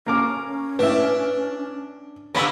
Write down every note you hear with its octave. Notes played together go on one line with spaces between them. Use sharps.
A#3 C#4 A#4 D6
A2 D4 B4 E5
D3 A#3 B3 C#5 F#5 B5 E6